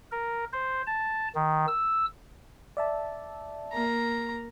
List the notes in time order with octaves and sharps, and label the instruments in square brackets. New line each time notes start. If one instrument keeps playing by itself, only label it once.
[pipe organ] A#4
C5
A5
D#3
E6
[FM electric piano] D5 E5 A5
[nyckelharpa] A#3 A#5